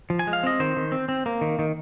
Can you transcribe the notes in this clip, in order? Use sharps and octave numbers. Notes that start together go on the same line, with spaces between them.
F3
G#5
G#3
F5
C4 D#5
D#3 C5
D#3
C4
C4
A#3
D#3
D#3